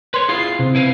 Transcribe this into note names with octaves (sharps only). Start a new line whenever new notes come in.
B4 C#5 C6
E4 F4 G#4 C7
C3 C4
E4 B4 F5